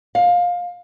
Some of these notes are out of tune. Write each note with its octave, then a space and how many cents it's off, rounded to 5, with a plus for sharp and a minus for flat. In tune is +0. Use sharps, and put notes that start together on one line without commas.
F5 +20